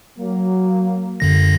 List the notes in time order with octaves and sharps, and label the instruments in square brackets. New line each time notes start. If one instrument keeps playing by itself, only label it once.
[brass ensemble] F#3 A#3
[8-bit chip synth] F#2 D3 A#6